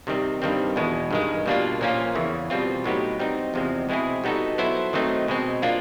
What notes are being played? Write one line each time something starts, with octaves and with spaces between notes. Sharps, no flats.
C3 D#3 G3 C4
G2 D#3 G3 C4
E2 B2 G#3
G2 D#3 G#3
B2 G3 A#3 D4 F4
A#2 F3 A#3 C#4 F4
E2 C#3 E3
B2 G3 C4 F4
A2 F#3 B3 D#4 G4
G3 C4 D#4
E2 C3 F3 G#3 C4
B2 G#3 C4 E4 G#4
G3 B3 D#4 F#4 A4
F#3 B3 E4 A4 C5
D#3 F#3 A3 C4 D#4
B2 G#3 C4
F3 A#3 D4 F4